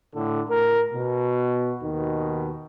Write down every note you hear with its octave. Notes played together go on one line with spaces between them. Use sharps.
A2 D3 A4
A2 A#4
B2
D#2 B2 D#3